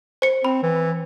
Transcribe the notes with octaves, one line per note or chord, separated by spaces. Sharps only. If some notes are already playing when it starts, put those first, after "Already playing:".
C5 C#7
C4 B5
E3